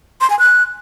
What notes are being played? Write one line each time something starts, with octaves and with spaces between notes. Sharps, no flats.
C6
G#5
F#6